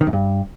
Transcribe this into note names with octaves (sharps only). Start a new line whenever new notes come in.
D#3
F#2
G2